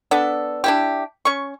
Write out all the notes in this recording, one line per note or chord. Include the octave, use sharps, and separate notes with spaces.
B3 D4 A4
D4 E4 G4
C#4 C#6